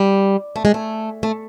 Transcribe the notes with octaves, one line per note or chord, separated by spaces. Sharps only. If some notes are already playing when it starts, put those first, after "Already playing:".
Already playing: G3
A3
G#3
A3
A3